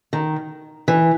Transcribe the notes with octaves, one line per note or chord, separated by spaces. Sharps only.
D#3
E3